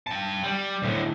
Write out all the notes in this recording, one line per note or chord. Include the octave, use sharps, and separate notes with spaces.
G5 A5
G3
D2 A2